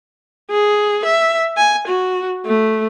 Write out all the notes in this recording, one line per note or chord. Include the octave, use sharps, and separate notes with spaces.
G#4
E5
G#5
F#4
A3